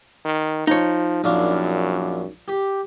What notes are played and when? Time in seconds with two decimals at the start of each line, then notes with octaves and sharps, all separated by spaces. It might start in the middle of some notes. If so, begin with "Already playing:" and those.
0.25 D#3
0.67 F3 D#4 C#5
1.24 A#1 F#2 D4 F5
2.48 G4